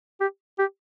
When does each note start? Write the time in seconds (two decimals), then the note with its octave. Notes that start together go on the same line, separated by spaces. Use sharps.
0.20 G4
0.59 G4